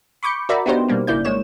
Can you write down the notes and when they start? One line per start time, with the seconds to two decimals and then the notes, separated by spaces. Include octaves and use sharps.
0.23 B5 C#6 D6 G6 C#7
0.49 F#4 A#4 D5 E5 A#5 B5
0.66 B3 D4 D#4 F#4 G4 C5
0.89 B2 G3 A#3 D4
1.07 G#1 C#3 A#3 E4 D5 G6
1.25 G#1 G#2 G#3 A#3 C#5 E7